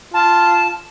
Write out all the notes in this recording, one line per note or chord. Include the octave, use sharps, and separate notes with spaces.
F4 A5